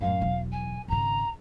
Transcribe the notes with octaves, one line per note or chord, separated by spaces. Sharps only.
F#2 A2 F5
E1 F#3
G#5
G#1 C#3 A#5